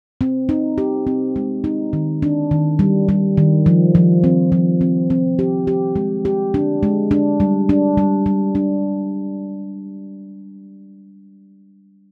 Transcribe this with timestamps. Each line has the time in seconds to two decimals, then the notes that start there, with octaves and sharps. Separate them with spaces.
0.21 C4
0.49 D#4
0.78 G4
1.07 C4
1.36 G#3
1.64 D#4
1.93 D#3
2.22 D4
2.51 D#3
2.79 G3
3.09 G3
3.37 D#3
3.66 F3
3.95 F3
4.24 C4
4.52 F3
4.81 C4
5.10 C4
5.39 G4
5.67 G4
5.96 G#3
6.25 G4
6.54 D4
6.83 G#3
7.11 D4
7.40 G3
7.69 D4
7.97 G3
8.26 G3
8.55 D4